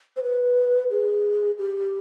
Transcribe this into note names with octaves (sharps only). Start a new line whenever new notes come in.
C5
B4
G#4
G4